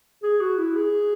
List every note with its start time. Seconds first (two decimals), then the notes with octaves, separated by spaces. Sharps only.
0.23 G#4
0.40 F#4
0.58 E4
0.76 G#4